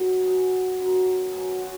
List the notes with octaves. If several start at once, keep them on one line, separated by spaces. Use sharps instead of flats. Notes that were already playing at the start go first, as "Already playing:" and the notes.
Already playing: G#2 F#3 D#4
B2 F#3 G#4
F#2 D#3 F#3
B2 F#3 G#4
F#4